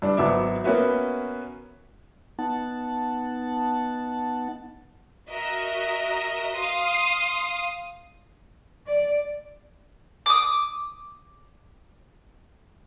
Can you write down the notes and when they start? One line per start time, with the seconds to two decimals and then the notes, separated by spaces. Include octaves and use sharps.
0.02 G2 D4
0.17 G#1 F#3 B3 E5 D6
0.64 A#3 B3 C#4 F#4 B4 E5
2.39 B3 D#4 F#5 A5
5.30 F#4 A#4 D#5 E5
6.57 F5 C6 D#6
8.87 D5
10.26 D6 D#6